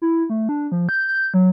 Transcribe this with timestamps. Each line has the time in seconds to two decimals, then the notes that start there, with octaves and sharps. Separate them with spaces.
0.02 E4
0.30 A3
0.49 D4
0.72 F3
0.89 G6
1.08 G6
1.34 F#3